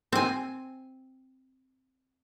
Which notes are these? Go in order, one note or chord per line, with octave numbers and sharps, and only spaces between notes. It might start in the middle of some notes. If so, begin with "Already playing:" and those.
C4 G#5